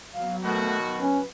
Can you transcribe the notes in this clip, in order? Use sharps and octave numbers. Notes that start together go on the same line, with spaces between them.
F#3 B3 F5
B2 D#3 A3 F#4
C#4 B4